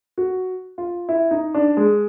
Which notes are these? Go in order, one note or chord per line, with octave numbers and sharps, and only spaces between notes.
F#4
F4
E4
D#4
D4
G#3